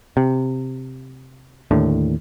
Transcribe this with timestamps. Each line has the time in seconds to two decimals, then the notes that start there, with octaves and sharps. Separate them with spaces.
0.17 C3
1.71 D#2 A2 D3